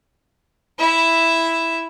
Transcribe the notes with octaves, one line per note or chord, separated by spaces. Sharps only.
E4 E5